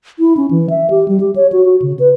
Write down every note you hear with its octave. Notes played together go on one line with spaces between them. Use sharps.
E4
C#4
E3
E5
G4
G3
G4
C#5
F#4
F#4
C#3
B4